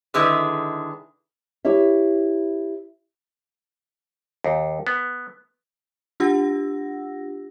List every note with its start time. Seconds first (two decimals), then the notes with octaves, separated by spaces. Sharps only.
0.14 D3 D#3 G#3 E4 G#4 B4
1.65 E4 G4 C#5 E5
4.44 D#2
4.87 B3
6.20 D4 F4 G4 F#5 E6 A#6